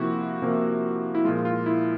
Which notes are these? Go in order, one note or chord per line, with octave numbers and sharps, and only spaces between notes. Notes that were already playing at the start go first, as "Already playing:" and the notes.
Already playing: C3 F3 A#3 E4 F#4
C3 F3 A#3
E4
A#2 F3 G#3 F4
F4
E4